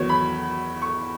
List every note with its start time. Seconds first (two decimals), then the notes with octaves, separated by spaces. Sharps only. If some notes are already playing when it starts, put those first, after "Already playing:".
Already playing: E2 D#3 F#3 B3 C#5
0.09 B5
0.82 C#6